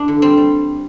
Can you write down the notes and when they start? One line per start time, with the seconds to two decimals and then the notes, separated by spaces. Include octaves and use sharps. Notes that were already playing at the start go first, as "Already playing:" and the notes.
Already playing: D4 E4
0.08 D3
0.22 G3 C4
0.37 G3